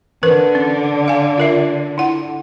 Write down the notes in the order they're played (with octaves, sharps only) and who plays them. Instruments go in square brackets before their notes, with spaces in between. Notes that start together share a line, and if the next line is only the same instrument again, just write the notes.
[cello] D3 [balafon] E3 A#4 B4
[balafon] C#4
F5 G#5
F4 A#4 E5
E4 F#5